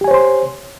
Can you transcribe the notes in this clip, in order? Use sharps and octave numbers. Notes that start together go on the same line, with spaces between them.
G4 C5 C#5 G#5 C6